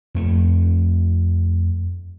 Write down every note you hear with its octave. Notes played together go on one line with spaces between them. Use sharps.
F2 A3